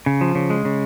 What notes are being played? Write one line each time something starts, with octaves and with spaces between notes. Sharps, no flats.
C#3
F3
C#3
G#3
C#3